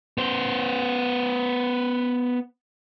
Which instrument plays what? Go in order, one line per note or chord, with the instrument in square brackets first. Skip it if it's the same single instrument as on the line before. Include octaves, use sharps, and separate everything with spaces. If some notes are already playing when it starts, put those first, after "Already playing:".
[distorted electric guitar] B3 C5